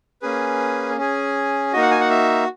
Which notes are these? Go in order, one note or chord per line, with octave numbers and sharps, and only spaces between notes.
A#3 C#4 G#4 B4
C#4 G#4
A#3 D#4 F#4 D#5
F#5
G#5
F#5
E5